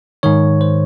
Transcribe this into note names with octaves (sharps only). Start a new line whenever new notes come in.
G#2 D#3 C#5
C5